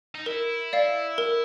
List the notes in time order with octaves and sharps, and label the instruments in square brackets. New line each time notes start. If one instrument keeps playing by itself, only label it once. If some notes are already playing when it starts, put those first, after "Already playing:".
[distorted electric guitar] D#4
[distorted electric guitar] E4 [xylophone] A#4
[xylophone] D5 F5
A#4